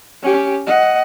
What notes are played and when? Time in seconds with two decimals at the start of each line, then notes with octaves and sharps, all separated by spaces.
0.23 C#4 G4
0.67 D#5 F#5